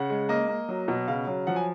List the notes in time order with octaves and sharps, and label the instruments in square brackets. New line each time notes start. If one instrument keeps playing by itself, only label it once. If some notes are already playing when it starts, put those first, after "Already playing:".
Already playing: [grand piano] C#3 F#5
G#3
A#3 D#5
A#3
F#3
B2
C#3 F5
F#3
F3 F#5
G#5